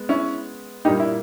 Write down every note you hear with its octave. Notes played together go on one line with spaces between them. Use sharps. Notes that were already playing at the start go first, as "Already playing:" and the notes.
Already playing: G#3 B3
C#4 E4
A#2 G3 A#3 D#4 G4
E4